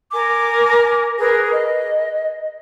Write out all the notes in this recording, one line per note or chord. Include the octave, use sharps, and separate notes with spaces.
A#4 G#5 D6
G#4 A#4 B4
D#5